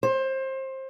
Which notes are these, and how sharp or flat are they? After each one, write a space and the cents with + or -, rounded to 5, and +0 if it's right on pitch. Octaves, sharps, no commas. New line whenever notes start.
C5 +25